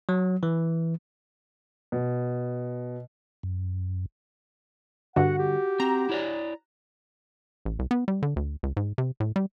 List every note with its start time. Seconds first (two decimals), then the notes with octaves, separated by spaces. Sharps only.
0.09 F#3
0.43 E3
1.92 B2
3.43 F#2
5.16 G2 D3 F#4 F#5
5.39 G4
5.80 C4 A#5
6.09 E4 C#5 D5
7.65 A1
7.79 C2
7.91 B3
8.08 G3
8.22 D3
8.36 D2
8.63 C#2
8.77 G#2
8.98 C3
9.20 A2
9.36 G3